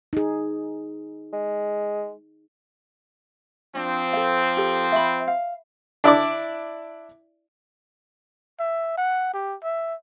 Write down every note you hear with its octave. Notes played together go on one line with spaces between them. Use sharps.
D#4 G#4
G#3
F3 C4 D4
A4 F5
G4 A4
E5 B5
F5
D4 E4 D5 D6
E5
F#5
G4
E5